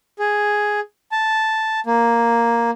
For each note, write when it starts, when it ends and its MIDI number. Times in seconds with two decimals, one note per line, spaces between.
0.19 0.80 68
1.12 1.80 81
1.86 2.71 58